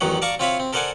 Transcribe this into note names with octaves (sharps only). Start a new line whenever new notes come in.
A1 E2 A2 D#3 F#3 F#5
D5 F5 A5 A#5 C#6 D6
C4 F4 C#5 E5 F5 B5
C4
A4 A#4 C5 D5 F#5 G#5